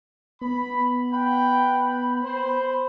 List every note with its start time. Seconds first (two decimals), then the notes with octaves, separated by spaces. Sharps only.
0.41 B3 B5
1.13 F#5 G5 B5
2.23 C5